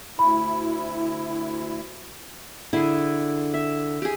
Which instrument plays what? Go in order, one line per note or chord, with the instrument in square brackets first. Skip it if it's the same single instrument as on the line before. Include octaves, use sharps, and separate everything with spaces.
[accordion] D2 E4 [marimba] B5
[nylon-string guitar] D3 [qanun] E4 G#4
[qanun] E5
G4 G#4